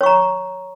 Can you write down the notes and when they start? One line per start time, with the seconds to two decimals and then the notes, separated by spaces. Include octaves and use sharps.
0.01 C#5
0.03 C#6
0.06 A#5